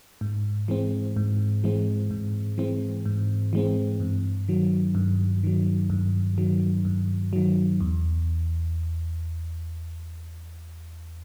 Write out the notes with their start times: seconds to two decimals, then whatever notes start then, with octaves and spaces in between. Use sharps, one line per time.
0.21 G#2
0.68 E3 G#3 C4
1.16 G#2
1.64 E3 G#3 C4
2.11 G#2
2.58 E3 G#3 C4
3.05 G#2
3.53 E3 G#3 C4
4.00 G2
4.48 D#3 F#3
4.95 G2
5.43 D#3 F#3
5.90 G2
6.38 D#3 F#3
6.85 G2
7.33 D#3 F#3
7.80 E2